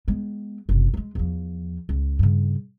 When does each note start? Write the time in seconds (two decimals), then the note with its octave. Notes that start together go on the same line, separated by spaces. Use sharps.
0.08 G#3 B3
0.69 F#1 C3
0.94 F#3 G#3
1.15 E2 F3
1.89 C#2
2.19 G2 C#3